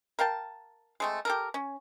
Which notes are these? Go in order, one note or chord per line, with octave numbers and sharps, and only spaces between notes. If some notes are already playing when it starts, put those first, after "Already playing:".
A#4 F5 G5 A5
G#3 A3 C4
G4 A4 A#4
C#4